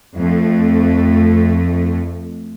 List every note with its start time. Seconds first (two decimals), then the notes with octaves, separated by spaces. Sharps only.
0.15 F2 A3